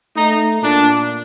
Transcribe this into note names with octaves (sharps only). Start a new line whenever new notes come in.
A3 D#4
A#2 D4